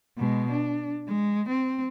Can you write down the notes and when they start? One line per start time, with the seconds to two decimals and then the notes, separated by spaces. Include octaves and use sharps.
0.18 B2 G#3
0.51 D4
1.08 G#3
1.50 C4